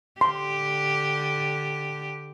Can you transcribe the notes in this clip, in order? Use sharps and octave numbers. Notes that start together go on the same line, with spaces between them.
D3 G4 C6